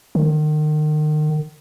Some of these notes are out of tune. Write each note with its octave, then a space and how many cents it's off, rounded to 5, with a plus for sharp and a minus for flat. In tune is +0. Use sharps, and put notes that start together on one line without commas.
D#3 -35